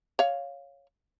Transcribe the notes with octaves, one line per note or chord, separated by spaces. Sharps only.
C#5 F5